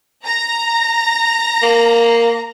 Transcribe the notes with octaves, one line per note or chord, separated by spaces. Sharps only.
A#5 A#6
A#3